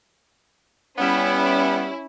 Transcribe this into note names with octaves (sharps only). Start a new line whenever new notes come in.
G3 B3 C#4 E4